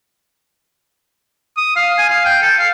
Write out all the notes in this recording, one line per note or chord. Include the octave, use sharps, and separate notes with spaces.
D#6
F5
G#5
F5
G5
A4
F5